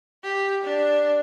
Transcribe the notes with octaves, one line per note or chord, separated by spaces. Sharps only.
G4
D4